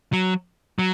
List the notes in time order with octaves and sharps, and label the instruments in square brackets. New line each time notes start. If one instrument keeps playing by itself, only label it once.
[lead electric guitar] F#3
F#3